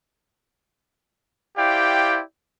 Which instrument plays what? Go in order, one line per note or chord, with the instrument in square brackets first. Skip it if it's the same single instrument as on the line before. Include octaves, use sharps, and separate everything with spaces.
[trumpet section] E4 G4 C5 D5 F5 G5